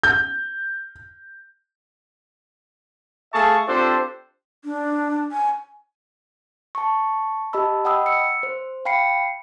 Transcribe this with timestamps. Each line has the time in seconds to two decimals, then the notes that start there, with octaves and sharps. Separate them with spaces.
0.03 G6
3.34 A3 G#4 E5 F5 A5 C#6
3.68 C4 D4 F4 G4 A4 C5
4.65 D4
5.32 G#5
6.75 A5 C#6
7.53 G4 D#5 A5 B5 E6
7.85 D#5 F#5 G5 B5 D#6 E6
8.06 E6 C#7
8.43 C5
8.85 F5 G5 B5 C7 C#7